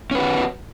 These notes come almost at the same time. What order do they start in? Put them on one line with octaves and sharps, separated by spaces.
C#4 B4 F#4